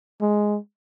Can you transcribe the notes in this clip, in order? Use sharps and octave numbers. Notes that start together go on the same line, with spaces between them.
G#3